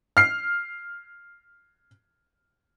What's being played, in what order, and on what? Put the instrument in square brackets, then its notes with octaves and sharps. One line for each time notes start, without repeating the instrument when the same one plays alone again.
[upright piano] F6 C7